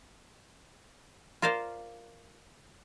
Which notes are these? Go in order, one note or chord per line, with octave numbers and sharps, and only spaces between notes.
F4 A#4 C5 D5 F5